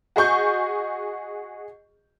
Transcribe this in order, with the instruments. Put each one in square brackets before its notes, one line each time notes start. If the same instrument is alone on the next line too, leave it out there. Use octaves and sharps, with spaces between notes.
[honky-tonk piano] F#4 G#4 D#5 C#6 G6